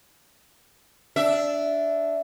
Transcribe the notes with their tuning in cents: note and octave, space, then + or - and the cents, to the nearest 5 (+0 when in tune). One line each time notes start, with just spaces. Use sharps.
D4 -10 E5 +0